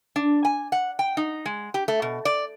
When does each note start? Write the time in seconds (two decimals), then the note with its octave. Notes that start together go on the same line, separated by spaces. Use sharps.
0.16 D4
0.45 G#5
0.72 F#5
0.99 G5
1.17 D#4
1.46 G#3
1.74 G4
1.88 A3
2.02 B2
2.25 D5